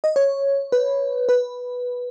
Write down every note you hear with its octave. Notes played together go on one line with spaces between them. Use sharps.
D#5
C#5
B4
B4